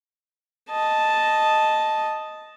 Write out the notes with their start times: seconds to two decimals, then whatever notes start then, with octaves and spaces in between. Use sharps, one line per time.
0.70 D#5 A5